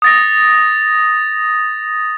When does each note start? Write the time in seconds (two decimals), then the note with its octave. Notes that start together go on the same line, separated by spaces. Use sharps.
0.02 D#6 A6 A#6